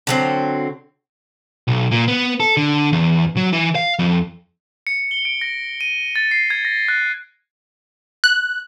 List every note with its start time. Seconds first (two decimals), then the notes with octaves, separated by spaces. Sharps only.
0.07 D3 F#3 C4
1.68 B1
1.91 A#2
2.08 B3
2.40 A4
2.57 D3
2.93 E2
3.37 F#3
3.53 E3
3.75 F5
3.99 F2
4.87 C#7
5.11 G7
5.25 D7
5.41 A#6
5.81 D#7
6.16 A6
6.31 C7
6.50 G#6
6.65 A#6
6.88 F#6
8.24 F#6